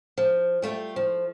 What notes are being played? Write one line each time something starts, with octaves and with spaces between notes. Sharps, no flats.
F3
G3 A3 F4
F3